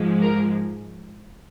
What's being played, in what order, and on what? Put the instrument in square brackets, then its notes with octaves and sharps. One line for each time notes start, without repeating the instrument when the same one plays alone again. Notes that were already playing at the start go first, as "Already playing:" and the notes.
Already playing: [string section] G#2 F3 G#3
A#4